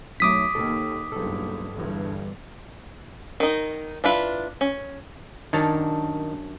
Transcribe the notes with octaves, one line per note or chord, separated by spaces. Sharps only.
B1 F#3 A3 D6 D#6 B6
D#2 A4
F#1 B1 G2 A4
G1 E2 G2
D#3 D#4
D4 E4 F4 B4
C#4
F#2 D#3 C#4 D4